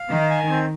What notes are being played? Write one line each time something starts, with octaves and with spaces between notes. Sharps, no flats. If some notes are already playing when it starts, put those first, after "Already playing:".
Already playing: F5
D#3 D#4
G#5
C4